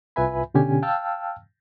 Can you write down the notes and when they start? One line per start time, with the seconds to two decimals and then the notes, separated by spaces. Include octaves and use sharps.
0.16 C2 F4 B4 E5 G#5 B5
0.54 B2 D3 C#4 G4 G#5
0.83 F5 G5 A5 E6 F6